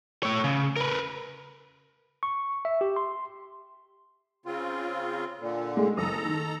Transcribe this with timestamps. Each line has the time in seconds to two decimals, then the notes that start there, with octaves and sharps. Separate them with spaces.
0.23 A3 C#5
0.44 C#3
0.76 A#4 B4
2.23 C#6
2.65 E5
2.81 G4
2.96 C6
4.46 C#3 C4 F4
5.39 A#2 D3
5.77 G#3 A3
5.97 F#1 A4 A#5 D#6
6.25 D#3